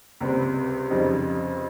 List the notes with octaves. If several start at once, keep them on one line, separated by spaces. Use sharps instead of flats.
C#2 C3 G3 C4
F2 C#3 G3 C4 D#4